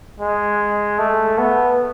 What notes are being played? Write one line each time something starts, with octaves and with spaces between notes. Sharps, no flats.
G#3
A3
B3